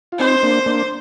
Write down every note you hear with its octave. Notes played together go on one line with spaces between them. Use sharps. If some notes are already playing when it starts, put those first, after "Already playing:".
F4
C4 D#4 C5
A#3 D4
A#3 D4